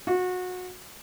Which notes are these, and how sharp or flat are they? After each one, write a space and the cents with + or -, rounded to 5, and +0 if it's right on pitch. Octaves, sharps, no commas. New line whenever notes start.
F#4 -25